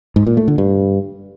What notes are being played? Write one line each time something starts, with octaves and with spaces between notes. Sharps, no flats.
G#2
A#2
A3
D3
G2